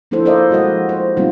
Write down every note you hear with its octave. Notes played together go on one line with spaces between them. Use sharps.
F3 A#3 D4 E4 A4 C5
A4 A#4 C5 D5 D#5 F5
G3 G#3 F#4 A4 D#5 F#5
F3
C5
G3 A#3 C4 D4 D#4 F4